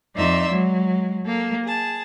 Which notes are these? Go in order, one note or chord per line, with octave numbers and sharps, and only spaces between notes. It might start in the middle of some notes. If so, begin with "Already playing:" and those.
F2 D#4 D5 E5 C6
F#3 G#3
A#3 A4
G#4 A5